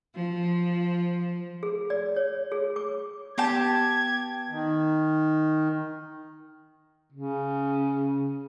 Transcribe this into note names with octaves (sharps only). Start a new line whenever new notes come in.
F3
G#4
D5
C#5
G#4
D6
B3 G4 G5 A5 G#6
D#3
C#3